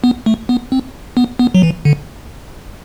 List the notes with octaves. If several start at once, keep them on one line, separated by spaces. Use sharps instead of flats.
B3
A3
B3
C4
B3
B3
F#3
E3
D3